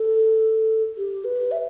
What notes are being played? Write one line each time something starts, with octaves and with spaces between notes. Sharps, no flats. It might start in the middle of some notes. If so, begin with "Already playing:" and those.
Already playing: A4
G4
B4
E5